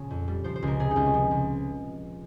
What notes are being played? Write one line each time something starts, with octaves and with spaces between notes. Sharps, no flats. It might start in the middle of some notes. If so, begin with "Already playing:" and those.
Already playing: A#1 C#3 C#5
F2
G3
F3 C5
C5
C#2 A#4
C3 G#4
D#4
C#2 F4
C#4
F3
C#2